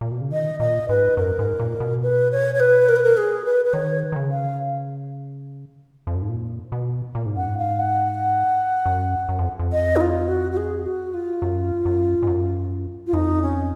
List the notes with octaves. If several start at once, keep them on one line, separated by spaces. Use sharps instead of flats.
A#2
B2
C#3
D#3 D#5
A#2 D#5
G#2 B4
F#2 A#4
G#2
A#2
B2
B4
C#5
C#5
B4
A#4
B4
A#4
G#4
B4
B4
D#3 C#5
D#3
C#3
F5
F2
F#2
G#2
A#2
B2
A#2
G#2
F#2 F#5
G#2
F5
F#5
F#2
F#2
F2
F2
D#5
D#4
F4
F#4
F#4
G#4
F#4
F4
F#2
F#2
G#2
F#2
F4
F2 D#4
C#4